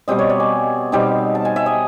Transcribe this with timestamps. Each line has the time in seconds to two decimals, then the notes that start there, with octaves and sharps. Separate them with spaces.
0.08 B2 G3 C4 D#5
0.19 C#5
0.30 D5
0.40 G#5
0.92 B2 G3 C4 D#4
1.35 A5
1.45 G#5
1.56 E5
1.66 D#5